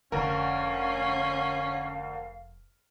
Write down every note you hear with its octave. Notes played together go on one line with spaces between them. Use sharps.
F1 D2 C#4 A#4 F5